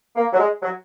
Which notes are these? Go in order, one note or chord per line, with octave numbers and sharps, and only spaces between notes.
A#3
F#3
G#3
F#3